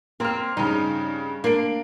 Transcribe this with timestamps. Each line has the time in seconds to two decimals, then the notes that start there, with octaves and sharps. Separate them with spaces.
0.20 A#3 C4 F6
0.57 G2 C#3 D#4
1.44 A#3 D4 D7